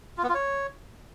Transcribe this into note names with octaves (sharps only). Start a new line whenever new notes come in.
F4
B3
F4
C#5